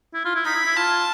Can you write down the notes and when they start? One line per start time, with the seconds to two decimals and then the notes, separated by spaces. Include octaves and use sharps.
0.14 E4
0.25 F4
0.35 E4
0.45 D#4 B5
0.56 E4
0.66 E4
0.76 F4 A5